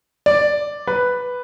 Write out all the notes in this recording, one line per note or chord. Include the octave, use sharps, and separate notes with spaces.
D5
B4